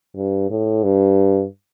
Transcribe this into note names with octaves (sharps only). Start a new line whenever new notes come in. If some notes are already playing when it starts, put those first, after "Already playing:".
G2
A2
G2